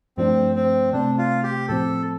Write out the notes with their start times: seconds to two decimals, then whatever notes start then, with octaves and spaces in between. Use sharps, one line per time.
0.17 G2 F3 A3 C4 D4
0.56 C4
0.93 C3 A3 C4 D4
1.18 F4
1.43 G4
1.68 A2 F3 C4 A4